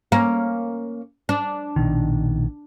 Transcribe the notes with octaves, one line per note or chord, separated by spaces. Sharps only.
A#3 C#4
D4
A#1 B2 D#3